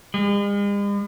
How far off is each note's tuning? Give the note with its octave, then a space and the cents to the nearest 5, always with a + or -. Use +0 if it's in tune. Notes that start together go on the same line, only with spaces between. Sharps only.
G#3 -45